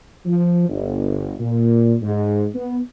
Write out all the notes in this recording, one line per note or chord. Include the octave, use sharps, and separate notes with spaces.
F3
G1
A#2
G#2
B3